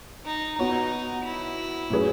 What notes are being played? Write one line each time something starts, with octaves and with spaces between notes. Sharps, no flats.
D#4
B3 D#4 F#4 C#5
E4
A2 F#3 C#4 G#4 B4